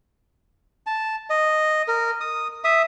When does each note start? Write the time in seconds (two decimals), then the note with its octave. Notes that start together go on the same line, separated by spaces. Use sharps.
0.86 A5
1.30 D#5
1.88 A#4
2.21 D#6
2.64 E5 D#6